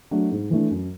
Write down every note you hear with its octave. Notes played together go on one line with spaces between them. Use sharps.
F#3 A3 D4
G#2
E3 A3 D4
F#2